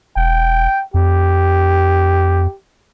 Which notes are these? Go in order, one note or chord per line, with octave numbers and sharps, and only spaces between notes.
E1 G5
F2 G4